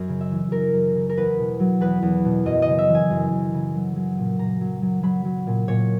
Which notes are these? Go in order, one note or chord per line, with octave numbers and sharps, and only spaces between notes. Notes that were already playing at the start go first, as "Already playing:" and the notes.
Already playing: F#2
C#3
E5
E3
F#2 A#4
F#2
C#3
A#4
E2 B4
B2
F#3
E2 B4
E2
B2
F#2 D#5
C#3 D#5
E5
E3
G#5
F#2
F#2
C#3
F#3
F#3
A#2
A#2 A#5
F#3
F#3
F#3 B5
F#3
A#2
A#2 C#5